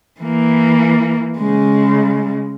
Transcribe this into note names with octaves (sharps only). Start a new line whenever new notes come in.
E3 A#3
C#3 G#3